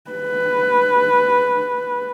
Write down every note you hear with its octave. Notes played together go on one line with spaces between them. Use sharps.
B4